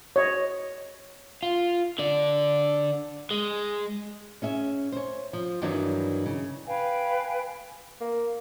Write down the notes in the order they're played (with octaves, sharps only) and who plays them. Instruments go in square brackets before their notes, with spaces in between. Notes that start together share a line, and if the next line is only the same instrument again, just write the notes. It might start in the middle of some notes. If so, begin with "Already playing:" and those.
[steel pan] C#5 D#5
[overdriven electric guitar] F4
D3 D5
G#3
[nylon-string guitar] C#4 G#4 E5
C5 C#5
F3
G2 D#3 E3 F#3 D4
C#3
[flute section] B4 F5 G5 G#5
[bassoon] A#3